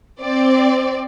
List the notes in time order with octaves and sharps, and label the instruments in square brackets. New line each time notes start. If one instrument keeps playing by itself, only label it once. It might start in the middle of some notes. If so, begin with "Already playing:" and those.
[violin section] C4 D5